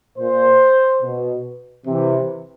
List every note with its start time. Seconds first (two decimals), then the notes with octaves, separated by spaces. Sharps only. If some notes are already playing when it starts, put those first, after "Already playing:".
0.18 A#2 C5
1.02 B2
1.86 C3 E3